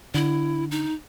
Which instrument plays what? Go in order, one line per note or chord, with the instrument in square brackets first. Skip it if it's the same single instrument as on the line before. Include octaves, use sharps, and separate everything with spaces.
[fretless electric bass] D3 [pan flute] E4
[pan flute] D#4